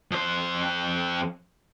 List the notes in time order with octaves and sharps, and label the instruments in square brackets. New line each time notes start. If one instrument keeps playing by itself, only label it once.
[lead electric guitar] F2 C5